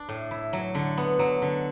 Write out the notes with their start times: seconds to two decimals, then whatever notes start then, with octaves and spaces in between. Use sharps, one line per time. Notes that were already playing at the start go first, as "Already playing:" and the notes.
Already playing: D4
0.09 A2
0.31 E4
0.53 F#3
0.75 D3
0.97 B3
1.19 F#3
1.42 D3